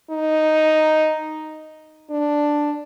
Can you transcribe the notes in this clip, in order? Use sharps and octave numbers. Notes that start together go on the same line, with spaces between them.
D#4
D4